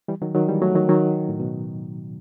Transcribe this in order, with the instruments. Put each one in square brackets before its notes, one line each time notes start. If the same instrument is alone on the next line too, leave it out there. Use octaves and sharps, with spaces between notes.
[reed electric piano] E3 G3
D#3 F#3
D#3 F#3
E3 G3
F#3 A3
D#3 F#3
D#3 F#3
A2
B2